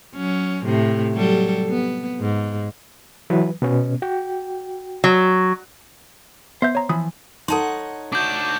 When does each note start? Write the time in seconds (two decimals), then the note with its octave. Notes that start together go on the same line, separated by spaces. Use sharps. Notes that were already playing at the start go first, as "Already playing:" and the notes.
0.15 F#3 C#4
0.65 A2 C3
1.13 F#3 G3 A4
1.69 B3
2.21 G#2
3.30 E3 F#3 B4
3.62 B2 B3 C#4
4.02 F#4 G5
5.04 F#3
6.62 B3 C5 E5 G6
6.75 C#5 A#5
6.89 E3 F3 B5 D#6
7.48 D#4 A4 C#5 F#5 A5 C6
8.12 D4 F#4 D6 G6